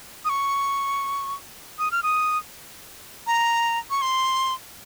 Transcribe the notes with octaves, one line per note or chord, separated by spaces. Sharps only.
D#6
C#6
D#6
F6
D#6
A#5
C#6
C6